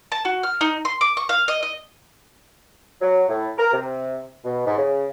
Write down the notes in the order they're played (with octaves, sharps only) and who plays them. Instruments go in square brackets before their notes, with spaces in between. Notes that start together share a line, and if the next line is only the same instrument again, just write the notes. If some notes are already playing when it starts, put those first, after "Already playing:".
[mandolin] A5
F#4
F6
D#4
C6
D6
C#6
F5
D#5
D#5
[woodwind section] F#3
A2
A#4
C3
B2
G#2
C#3